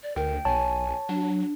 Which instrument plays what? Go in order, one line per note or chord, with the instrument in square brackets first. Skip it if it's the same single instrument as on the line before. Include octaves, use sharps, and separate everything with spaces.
[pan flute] D5
[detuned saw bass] D2 [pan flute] A#4 [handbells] G5
[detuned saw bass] B1 [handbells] C#5 [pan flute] G#5 [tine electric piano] A5
[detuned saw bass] F#3 [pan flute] D4